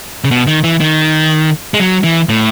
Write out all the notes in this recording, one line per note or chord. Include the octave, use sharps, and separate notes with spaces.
C#3
B2
D#3
E3
D#3
G#3
F#3
E3
A2